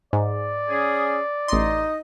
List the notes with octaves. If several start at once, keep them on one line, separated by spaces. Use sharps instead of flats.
G#2 D5
C#4 G#4
A1 D#4 D#5 C6